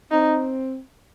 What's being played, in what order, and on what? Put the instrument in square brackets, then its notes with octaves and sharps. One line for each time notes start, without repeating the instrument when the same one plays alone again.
[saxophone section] C4 [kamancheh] D#4